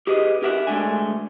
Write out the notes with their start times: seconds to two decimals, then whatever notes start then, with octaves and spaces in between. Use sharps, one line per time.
0.07 G4 G#4 B4 D#5
0.43 G4 A#4 E5 F#5
0.67 D2 G#3 A3 D4 G#5